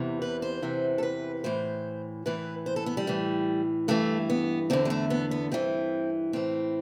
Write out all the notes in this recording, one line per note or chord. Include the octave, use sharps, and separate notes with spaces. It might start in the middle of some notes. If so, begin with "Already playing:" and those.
Already playing: E2 C3 E3
B4
C5
E2 C3 E3
A4
B4
A2 E3 C5
A2 E3 B4
C5
A4
B3
G3
A2 E3
G2 E3 A3
B3
E2 D3 C4
G3
A3
B3
B3
G2 E3 C4
A2 E3 C4